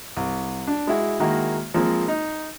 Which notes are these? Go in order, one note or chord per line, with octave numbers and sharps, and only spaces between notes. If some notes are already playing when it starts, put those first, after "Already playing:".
C2
D4
G#3 E4 F#4
D#3 G#3 A#3 E4 F#4
F3 G#3 A#3 C4
D#4